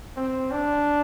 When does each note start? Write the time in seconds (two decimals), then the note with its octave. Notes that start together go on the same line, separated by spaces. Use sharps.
0.16 C4
0.51 D4